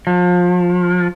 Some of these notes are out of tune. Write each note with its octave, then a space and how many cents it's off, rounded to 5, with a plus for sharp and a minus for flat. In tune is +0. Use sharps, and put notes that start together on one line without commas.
F3 +30